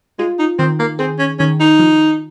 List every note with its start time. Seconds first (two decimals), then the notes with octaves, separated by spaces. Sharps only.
0.19 G#3 F4
0.39 D#4
0.59 D#3 C4
0.79 A#3
0.99 C4 G#4
1.19 C#4
1.39 D#3 C#4
1.60 D#4
1.79 F3